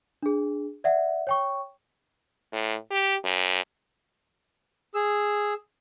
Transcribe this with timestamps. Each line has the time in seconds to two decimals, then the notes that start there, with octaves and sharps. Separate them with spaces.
0.23 D4 G#4
0.84 D5 E5 F#5
1.27 C#5 G5 C#6
2.53 A2
2.91 G4
3.25 F#2
4.95 G#4 E6